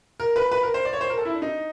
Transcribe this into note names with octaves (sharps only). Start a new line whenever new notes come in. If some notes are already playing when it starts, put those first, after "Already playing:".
A#4
B4
B4
A#4
C5
D5
C#5
C5
A#4
A4
E4
D4
D#4